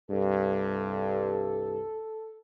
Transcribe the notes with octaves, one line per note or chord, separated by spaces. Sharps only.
C2 G2 A4